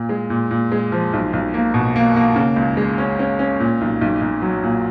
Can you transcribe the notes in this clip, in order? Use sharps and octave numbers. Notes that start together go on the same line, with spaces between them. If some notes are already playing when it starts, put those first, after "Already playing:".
Already playing: A#2
G#3
A#2
A#2
G#3
F3
B1
B1
A#3
B2
A#3
A#3
C#3
C#2
G#3
C#4
C#4
C#4
A#2
B1
B1
B1
F#3
A#2